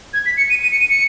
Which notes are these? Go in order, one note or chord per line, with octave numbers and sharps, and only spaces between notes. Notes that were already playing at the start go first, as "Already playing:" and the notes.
G#6
B6
C#7
D#7
D#7
C#7
D#7
C#7